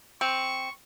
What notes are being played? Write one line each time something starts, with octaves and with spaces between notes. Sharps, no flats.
C4 C#6